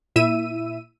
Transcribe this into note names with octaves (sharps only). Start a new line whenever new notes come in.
A#2 E4 E5 E6 D#7